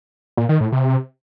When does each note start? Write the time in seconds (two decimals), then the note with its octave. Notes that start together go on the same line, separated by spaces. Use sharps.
0.37 A#2
0.49 D#3
0.61 A2
0.72 C3